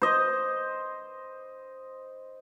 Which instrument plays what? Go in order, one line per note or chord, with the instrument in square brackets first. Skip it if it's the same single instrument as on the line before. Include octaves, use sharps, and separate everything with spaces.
[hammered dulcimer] C5 D#5